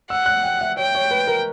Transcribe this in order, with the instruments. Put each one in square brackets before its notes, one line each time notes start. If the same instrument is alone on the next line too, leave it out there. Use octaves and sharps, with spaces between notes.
[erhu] F#5 [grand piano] E6
[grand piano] F#6
G5
E5
[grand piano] C#5 [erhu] G5
[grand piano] C#5
B4
A#4